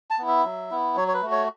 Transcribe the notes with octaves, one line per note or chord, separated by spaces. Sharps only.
A5
B3 E4
E5
F#3
B3 E4
F#3 C#5
C#5
B4
A3 F#4
C#5